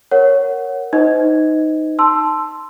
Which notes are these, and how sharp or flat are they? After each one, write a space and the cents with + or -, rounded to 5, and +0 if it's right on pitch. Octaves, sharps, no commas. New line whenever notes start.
A#4 +0 C#5 +0 F#5 +0
D#4 +0 C5 -45 D#5 +20
A5 -5 C6 +0 E6 +10